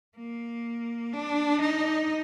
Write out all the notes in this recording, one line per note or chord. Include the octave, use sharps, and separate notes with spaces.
A#3
D4
D#4